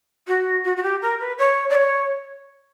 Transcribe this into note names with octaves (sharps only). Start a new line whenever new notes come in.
F#4
F#4
F#4
G4
A#4
B4
C#5
D5
C#5